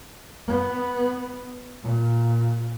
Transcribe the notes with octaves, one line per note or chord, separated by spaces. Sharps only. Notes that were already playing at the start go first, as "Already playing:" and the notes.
B3
A#2